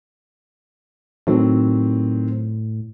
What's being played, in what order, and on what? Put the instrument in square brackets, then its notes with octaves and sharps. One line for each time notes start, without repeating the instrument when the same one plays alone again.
[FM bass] A2 [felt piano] D#3 F#3 C4